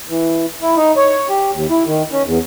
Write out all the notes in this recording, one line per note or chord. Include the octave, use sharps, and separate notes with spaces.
E3
E4
D#4
C#5
G4
D#2
E4
D#3
C#4
E2